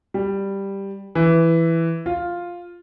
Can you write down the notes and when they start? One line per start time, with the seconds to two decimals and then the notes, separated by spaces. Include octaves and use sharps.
0.14 G3
1.15 E3
2.06 F4